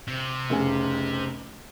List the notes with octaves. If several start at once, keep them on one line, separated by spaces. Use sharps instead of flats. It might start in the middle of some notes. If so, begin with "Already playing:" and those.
C3
F1 C#3 G#5